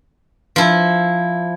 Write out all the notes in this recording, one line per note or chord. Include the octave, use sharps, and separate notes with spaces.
F3 E4